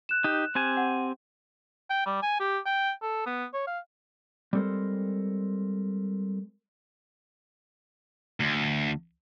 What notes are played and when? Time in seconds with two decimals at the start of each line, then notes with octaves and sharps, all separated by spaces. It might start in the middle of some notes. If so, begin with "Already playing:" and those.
0.09 F#6 E7
0.24 D#4 G4
0.55 C4 G4 G#5
0.77 F#5
1.90 G5
2.06 G3
2.22 G#5
2.40 G4
2.66 G5
3.02 A4
3.26 B3
3.54 C#5
3.67 F5
4.53 G3 G#3 C4 A4 A#4 C5
8.40 D2